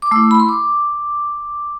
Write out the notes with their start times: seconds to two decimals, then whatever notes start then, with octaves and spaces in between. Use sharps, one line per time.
0.02 D6
0.11 A3 E4 E6
0.31 B5
0.40 C6
0.49 D6